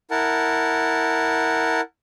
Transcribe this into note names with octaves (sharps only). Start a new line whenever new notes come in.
E4 A#4 F#5 A5